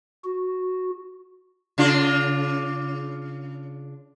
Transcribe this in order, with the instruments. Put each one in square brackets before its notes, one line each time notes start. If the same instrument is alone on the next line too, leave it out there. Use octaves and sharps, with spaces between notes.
[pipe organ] F#4
[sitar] C#3 D4 F4